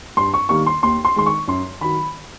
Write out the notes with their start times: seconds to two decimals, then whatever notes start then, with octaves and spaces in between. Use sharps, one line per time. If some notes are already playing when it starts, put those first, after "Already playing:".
0.17 G2 C6
0.34 C#6
0.49 D#3 G3 A#3 C#6
0.67 C6
0.83 D#2 C6
1.05 C6
1.16 D#3 G#3 C6
1.26 C#6
1.48 F#2 C6
1.81 D#3 F#3 B5